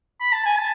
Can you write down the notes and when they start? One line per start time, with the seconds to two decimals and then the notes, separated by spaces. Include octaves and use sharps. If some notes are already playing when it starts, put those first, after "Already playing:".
0.20 B5
0.33 A5
0.46 G#5
0.57 A5